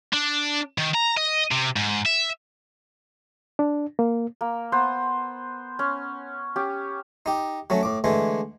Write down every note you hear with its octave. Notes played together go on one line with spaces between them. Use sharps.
D4
D#3
A#5
D#5
C3
G#2
E5
D4
A#3
A#3
B3 C5
C#4
C#4 G4
D#4 G4
F#3 A3 C#4
A2 D6
D3 E3 G#3 A3